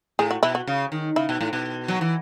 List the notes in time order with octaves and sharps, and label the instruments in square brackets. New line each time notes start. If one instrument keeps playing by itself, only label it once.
[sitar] A2 [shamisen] G#4
[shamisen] F#4
[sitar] B2 [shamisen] E4
[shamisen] F#4
[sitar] C#3
D#3
[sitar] C#3 [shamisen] E4
[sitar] B2
A2
B2
F#3
E3